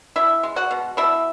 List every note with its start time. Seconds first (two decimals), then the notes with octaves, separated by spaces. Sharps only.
0.16 B2 E4 E5
0.43 G#3
0.56 F#4 F#5
0.71 B2
0.97 B2 E4 E5